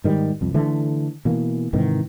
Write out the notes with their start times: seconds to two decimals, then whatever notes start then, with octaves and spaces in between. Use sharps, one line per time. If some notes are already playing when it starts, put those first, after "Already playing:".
0.04 G#2 D#3 G3
0.41 C2 F2
0.54 D3 E3 A3
1.25 B2 E3 A#3
1.73 G#2 C3 D#3 E3